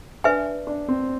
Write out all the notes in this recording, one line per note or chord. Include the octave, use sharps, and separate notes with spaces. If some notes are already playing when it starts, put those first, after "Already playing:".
D4 B4 E5 G#5
D4
C4